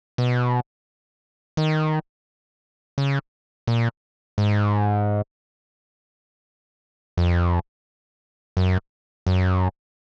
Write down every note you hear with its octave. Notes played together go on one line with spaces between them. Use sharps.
B2
D#3
C#3
A#2
G#2
F2
F#2
F#2